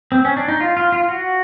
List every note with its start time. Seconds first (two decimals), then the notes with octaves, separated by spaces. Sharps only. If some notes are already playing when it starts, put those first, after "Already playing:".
0.12 C4
0.25 C#4
0.37 D4
0.48 D#4
0.61 F4
0.77 F4
0.92 F4
1.09 F#4